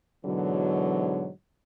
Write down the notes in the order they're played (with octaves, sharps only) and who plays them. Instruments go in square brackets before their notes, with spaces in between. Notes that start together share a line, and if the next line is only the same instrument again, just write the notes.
[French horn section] G#2 B2 D3 E3 F#3